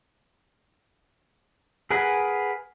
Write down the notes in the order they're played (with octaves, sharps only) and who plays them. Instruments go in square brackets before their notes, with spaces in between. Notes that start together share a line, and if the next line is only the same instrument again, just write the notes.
[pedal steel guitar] G#4 A#4 B4 F#5 G#5